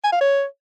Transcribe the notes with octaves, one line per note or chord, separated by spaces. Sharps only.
G#5
F5
C#5